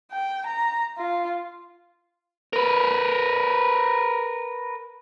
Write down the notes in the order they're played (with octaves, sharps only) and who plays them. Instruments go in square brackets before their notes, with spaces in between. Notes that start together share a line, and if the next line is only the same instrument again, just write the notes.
[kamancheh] G5
A#5
F4
[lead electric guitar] A#4 B4